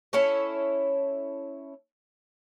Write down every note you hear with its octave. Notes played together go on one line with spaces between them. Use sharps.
C#4 E4 A4 C#5